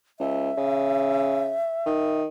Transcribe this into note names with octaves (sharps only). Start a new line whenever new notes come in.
C#2 E5
C#3
D#3